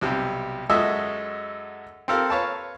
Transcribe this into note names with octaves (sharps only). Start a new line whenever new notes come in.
B1 C3 G3 G5
F#2 G#3 F#4 A4 D#5 E5
C4 G4 A4 A#4 F5
B4 C#5 F5 A5